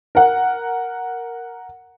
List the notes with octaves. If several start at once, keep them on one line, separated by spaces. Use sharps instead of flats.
A#4 F#5